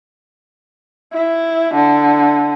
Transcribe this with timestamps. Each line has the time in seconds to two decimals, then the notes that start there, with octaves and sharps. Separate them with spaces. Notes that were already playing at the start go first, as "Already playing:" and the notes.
1.14 E4
1.75 D3